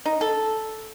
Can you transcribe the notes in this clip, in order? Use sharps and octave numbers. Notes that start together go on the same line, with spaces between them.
D#4
A4